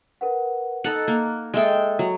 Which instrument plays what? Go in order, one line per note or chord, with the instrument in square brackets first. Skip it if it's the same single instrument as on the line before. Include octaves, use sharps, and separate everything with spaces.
[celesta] A#4 B4 F#5
[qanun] D#4 A4 F#5 [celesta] F#6
[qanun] A#3
[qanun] G#3 A4 G5 [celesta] D#5 E5 D#6
[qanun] F#3